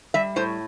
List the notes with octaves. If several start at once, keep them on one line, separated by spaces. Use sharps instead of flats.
G3 E5
A2 C5